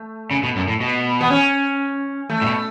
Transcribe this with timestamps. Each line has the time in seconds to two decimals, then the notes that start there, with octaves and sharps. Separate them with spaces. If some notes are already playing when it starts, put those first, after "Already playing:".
Already playing: A3
0.31 C#3
0.43 B2
0.56 F#2
0.68 A2
0.80 B2
1.21 B3
1.30 C#4
2.29 A3
2.41 A2
2.46 B2